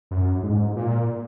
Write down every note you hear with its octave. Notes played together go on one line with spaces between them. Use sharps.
F#2
G#2
A#2